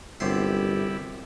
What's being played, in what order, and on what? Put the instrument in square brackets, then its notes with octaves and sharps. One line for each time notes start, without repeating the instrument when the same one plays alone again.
[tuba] G1 [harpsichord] F#2 C3 C6 [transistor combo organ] G3 E4